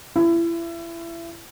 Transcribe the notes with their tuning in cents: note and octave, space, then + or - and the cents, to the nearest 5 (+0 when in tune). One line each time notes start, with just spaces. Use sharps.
E4 +30